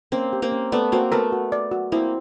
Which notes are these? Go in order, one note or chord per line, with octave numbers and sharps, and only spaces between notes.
A#3 C4 C#4
G4
A#3 C4
C#4
A3 B3 D5
A#3 C4 F#4
A3 B3 A#4
F#4
D5
F#4
A#3 C4 E4